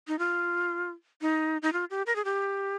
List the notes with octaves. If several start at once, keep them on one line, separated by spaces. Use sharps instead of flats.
D#4
F4
D#4
D#4
F4
G4
A#4
G#4
G4